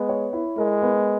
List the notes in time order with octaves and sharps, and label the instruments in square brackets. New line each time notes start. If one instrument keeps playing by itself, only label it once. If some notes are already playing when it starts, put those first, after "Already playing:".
Already playing: [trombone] G#3 [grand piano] B3
[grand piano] C#5
E4
[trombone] G#3 [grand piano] A#4
[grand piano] B3